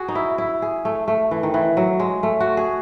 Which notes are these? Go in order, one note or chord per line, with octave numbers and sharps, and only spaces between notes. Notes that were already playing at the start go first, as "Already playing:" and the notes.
Already playing: F#4 G#4
D#4
E4
E4
G#4
A3
A3
E3
D#3
E3
F#3
G#3
A3
F#4
G#4